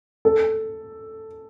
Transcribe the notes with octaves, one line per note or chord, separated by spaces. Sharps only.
A4